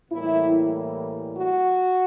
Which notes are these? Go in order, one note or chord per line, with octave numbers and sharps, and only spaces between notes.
A2 E3 G3 A#3 E4
F#4